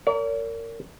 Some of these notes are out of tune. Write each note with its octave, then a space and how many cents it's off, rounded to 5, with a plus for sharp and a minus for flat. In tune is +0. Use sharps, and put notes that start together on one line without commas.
A#4 -25 C#5 +45